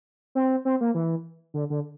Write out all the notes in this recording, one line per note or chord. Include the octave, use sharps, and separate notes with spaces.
C4
C4
A#3
E3
D3
D3